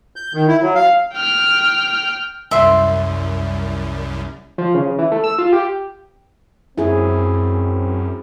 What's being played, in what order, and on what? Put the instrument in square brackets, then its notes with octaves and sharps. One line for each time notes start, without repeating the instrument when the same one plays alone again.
[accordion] G6
D#3
E4
F#3
F5
[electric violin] G5 F6
[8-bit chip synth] C2 F#2 [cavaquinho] E5 C6
[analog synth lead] F3
C#3
E3
A3
E6
F4
G4
[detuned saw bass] F#2 [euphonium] C4 [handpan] E4 G#4